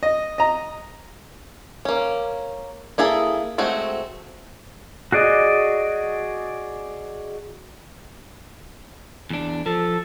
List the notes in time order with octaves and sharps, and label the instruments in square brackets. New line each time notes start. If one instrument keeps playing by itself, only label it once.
[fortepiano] D#5
D#5 A#5
[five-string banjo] A#3 C#4
A#3 E4 G#4 A4
G#3 A3 C4 F#4
[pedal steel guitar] F#4 G#4 D5 D#5
[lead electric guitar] E2 D4
[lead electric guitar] F3 [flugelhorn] A4